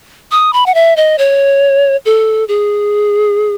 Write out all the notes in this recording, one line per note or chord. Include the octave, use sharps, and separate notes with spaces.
D#6
B5
F#5
E5
D#5
C#5
A4
G#4